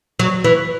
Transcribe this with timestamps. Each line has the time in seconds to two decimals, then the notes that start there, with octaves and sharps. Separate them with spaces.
0.19 F#3
0.44 E3